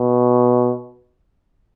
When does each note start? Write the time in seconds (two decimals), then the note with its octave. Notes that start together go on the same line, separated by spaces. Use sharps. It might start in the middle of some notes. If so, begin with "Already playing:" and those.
Already playing: B2